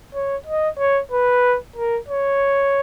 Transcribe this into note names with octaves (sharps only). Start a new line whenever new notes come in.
C#5
D#5
C#5
B4
A#4
C#5